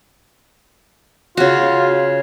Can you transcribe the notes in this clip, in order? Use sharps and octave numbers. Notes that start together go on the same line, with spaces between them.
C#3 F4 F#4